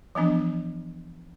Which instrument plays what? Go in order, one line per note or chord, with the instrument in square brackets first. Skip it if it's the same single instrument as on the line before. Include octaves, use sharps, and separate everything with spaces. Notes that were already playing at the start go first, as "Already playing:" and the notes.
[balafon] E3 F3 B3 D4